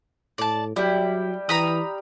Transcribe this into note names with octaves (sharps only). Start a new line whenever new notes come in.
A2 D5 A5
F#3 G3 E4 G5
E3 A#5 B5 D#6